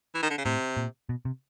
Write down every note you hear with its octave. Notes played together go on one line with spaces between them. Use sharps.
E3
D#3
D3
C#3
A2 C3
A#2
B2
C3